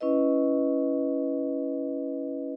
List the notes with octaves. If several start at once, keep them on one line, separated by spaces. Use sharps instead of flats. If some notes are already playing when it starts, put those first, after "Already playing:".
C#4 E4 B4 D#5